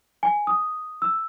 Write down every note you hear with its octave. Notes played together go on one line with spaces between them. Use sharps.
G#5
D#6
E6